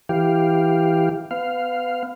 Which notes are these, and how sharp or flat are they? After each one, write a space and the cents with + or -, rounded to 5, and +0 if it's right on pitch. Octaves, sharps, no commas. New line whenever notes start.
E3 +0 G4 +0 F5 +0
B3 +30 F5 +0